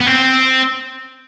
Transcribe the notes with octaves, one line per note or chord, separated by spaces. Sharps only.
B3
C4